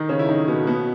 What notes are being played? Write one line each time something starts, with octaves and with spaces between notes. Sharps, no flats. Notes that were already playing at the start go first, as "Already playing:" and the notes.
Already playing: D#3 D#4
C#3 C#4
E4
D#3 D#4
B2 B3
B2 B3